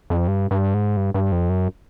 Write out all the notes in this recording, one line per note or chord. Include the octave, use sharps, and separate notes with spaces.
F2
G2
G2
G#2
G2
G2
F2
F#2